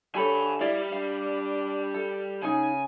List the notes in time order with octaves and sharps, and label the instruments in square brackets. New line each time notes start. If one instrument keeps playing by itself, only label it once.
[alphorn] D3 [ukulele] G4 A4 C#5 [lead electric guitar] G#5 B5
[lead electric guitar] G3 [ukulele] E4 D5 F5
[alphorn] D4 [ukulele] F5
[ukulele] A4
[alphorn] C#3 [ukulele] D#4 G#4 [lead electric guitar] G#5